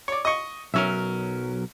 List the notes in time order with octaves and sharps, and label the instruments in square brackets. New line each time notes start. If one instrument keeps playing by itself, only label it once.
[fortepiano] C#5 D5
D#5 C#6
[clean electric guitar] B1 F#3 A#4 [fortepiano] C#4 E5